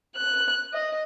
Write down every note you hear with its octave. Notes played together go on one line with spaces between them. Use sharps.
F#6
D#5